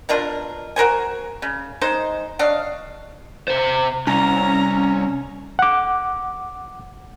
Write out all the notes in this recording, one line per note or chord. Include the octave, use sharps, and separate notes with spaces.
B2 D4 F4 A#4
F#4 A#4 C5 G#5
C#3
G#3 D#4 C5
D4 C#5 D#5 F5
C3 C5
C2 C#4 A#5
F#5 D6